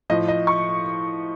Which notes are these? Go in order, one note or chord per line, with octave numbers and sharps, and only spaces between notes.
A2 F3 D#5
D#5
C#6